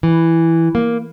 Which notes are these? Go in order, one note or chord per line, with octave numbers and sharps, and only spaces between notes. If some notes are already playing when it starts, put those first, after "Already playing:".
E3
A#3